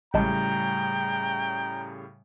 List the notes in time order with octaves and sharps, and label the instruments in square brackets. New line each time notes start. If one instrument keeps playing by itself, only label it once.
[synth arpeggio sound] A1 G#3 A5 [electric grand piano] A2 C#3 G3 [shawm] G5 [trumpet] A#5